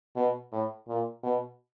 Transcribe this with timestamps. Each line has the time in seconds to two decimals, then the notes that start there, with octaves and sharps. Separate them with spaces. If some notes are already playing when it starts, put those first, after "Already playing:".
0.16 B2
0.52 A2
0.88 A#2
1.23 B2